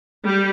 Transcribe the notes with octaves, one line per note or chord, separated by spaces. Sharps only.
G3